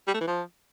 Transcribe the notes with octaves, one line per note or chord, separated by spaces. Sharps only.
G3
A3
E3
F3